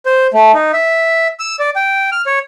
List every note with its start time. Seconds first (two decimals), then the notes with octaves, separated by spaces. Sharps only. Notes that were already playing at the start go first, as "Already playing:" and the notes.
0.06 C5
0.34 A3
0.54 D#4
0.73 E5
1.39 E6
1.59 D5
1.76 G5
2.12 F6
2.26 C#5